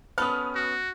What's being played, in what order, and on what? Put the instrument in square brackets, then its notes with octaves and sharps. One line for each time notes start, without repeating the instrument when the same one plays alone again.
[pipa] F#3 A4 B4 [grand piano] B3 C#4 [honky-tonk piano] D#6 F6
[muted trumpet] F#4